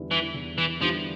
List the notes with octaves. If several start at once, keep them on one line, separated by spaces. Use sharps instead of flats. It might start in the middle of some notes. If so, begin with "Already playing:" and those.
Already playing: E2 D3 G3 B3 E4
E3
E2
E3
D3 F3 G3 B3 E4